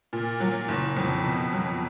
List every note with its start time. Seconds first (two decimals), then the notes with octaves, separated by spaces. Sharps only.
0.13 A#2
0.40 F#3
0.68 F#1
0.97 F2
1.24 B2
1.53 F#3